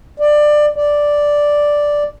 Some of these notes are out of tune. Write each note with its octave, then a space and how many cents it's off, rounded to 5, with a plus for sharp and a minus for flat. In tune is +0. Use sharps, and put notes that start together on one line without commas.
D5 +20
D5 +0